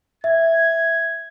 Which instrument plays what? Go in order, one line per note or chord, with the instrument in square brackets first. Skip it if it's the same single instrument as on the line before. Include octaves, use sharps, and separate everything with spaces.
[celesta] E5 [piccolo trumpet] G#6